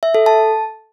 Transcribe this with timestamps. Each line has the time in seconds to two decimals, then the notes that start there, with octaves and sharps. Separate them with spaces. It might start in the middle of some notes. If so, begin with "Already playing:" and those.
0.03 E5
0.15 A4
0.26 A5